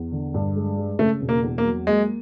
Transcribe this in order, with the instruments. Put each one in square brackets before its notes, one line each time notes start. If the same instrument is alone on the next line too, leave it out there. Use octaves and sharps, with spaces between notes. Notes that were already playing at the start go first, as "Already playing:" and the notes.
Already playing: [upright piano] E2
D3
G2
G#3
G#3
[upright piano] C#3 [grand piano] A3
[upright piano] E1
[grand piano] A#3
[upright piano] E2
[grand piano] A#3
[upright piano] F#3
[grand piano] G#3 [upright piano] A#3